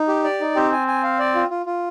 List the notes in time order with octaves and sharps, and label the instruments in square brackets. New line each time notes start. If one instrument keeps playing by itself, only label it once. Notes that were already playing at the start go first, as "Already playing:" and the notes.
Already playing: [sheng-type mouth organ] D#4
G4
D5
D#4
[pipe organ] C4 [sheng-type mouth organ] G4
[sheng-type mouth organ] G#5
G#5
F5
D5
F4
F4
F4